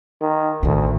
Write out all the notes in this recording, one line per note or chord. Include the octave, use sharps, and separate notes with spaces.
D#3
A1 D2 D#3